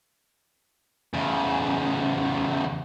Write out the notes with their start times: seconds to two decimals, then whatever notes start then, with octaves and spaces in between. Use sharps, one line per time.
1.14 E2 C#3